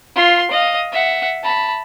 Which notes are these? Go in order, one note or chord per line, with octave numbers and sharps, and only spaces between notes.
F4 C6
D#5 F5
E5 F#5
A5 B5